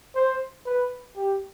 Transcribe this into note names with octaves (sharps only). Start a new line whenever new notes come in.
C5
B4
G4